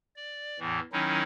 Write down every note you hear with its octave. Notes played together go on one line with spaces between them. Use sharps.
D5
E2 A2 E3
D#3 F#3 C#4 D#4 E4